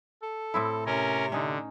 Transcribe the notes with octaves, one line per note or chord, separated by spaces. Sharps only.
A4
A2 C4 E4
C3 C#4 A#4
D3 C#4 D#4